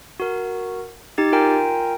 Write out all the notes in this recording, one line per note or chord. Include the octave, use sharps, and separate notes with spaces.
F#4 A#4
D#4 G4 A6
F4 A#4 G5 G#5 A#5